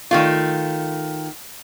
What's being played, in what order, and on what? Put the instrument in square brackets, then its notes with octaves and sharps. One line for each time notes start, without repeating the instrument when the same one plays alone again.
[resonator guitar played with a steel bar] D#3 A3 F4